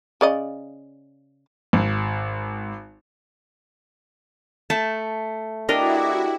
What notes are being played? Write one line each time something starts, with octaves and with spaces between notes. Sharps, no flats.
C#3 D5 D#5
G#1
A3 A5
D4 E4 F#4 G4 A#4 D#5